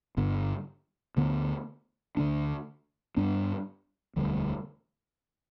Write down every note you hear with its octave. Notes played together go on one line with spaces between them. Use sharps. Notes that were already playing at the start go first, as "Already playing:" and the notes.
G1 G2 D3 B3
D2 D3 B3 D4
D2 D3 A3 D4
G2 G3 B3 D4
E1 D2 D3 G3